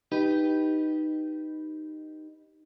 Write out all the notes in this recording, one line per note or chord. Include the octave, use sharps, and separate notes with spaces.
D#4 G4 B4